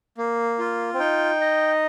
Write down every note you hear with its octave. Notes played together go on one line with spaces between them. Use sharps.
A#3
F4
C4
D#4 G5
D#5